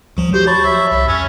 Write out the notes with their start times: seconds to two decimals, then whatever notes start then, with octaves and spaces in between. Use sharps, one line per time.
0.17 D2 F3 F#3
0.34 F#4 G4 C5
0.47 C#5 A5 B5 C#6
0.64 E5
0.91 C2
1.08 F2 C#4